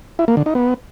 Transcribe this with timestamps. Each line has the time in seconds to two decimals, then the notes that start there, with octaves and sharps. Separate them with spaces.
0.19 E4
0.28 A#3
0.37 D3
0.46 D#4
0.55 B3